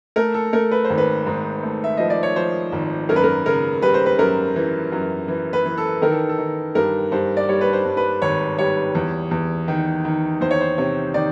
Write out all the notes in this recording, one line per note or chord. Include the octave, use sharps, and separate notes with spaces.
A3 A#4
A4
A3 A#4
B4
C5
G#1
B4
G#2
A3
E5
F3 D#5
D5
C#5
F3 C5
G#1
F#2 A#4
B4
A#4
C#3 A#4
G3 B4
C5
B4
F#2 A#4
E3
F#2
E3
B4
E3
A4
D#3 A#4
A4
A4
D#3
G2 A#4
G2 C5
D5
G3 C#5
B4
C5
G2
B4
G#1 C#5
G3 C#5
E2
E2
D#3
D#3
E2 C5
C#5
C5
C3 C#5
D#3 D5